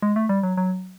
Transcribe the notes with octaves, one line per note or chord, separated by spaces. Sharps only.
G#3
A3
G3
F#3
F#3